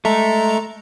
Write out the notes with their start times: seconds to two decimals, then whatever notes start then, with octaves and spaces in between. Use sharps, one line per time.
0.05 G#3 A3 A#5